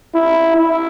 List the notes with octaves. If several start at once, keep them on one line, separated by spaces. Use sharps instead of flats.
E4
E4